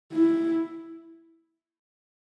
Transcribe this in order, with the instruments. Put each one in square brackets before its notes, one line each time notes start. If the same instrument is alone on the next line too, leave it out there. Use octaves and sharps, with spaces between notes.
[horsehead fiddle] E4